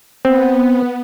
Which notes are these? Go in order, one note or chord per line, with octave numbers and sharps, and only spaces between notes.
B3 C4